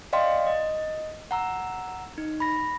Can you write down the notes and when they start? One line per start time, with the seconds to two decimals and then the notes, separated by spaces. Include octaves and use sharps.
0.13 D5 D#5 F5 G5 C6
0.47 D#5
1.31 F#5 A#5 E6
2.18 D#4
2.40 B5 A#6